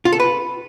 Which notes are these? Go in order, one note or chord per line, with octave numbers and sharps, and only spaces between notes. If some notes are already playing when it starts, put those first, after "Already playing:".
F4
A4
B4